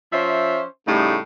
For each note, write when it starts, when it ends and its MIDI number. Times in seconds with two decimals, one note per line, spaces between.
0.12 0.62 53
0.12 0.62 61
0.12 0.62 72
0.12 0.62 76
0.87 1.16 45
0.87 1.16 49
0.87 1.16 55
0.87 1.16 57
0.87 1.16 63